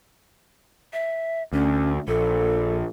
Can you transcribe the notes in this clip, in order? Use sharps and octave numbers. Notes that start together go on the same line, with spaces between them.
E5
D2 C#4
A#1 A4